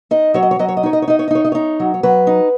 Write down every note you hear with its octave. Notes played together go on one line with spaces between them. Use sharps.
D#4 D#5
F#3 C#5
D#5
C#5
F#3 D#5
C#5
D#5
D#4 C#5
D#5
C#5
D#4 D#5
C#5
D#5
D#4 C#5
D#5
D#4 C#5
F#3
C#5
F#3 B4
D#4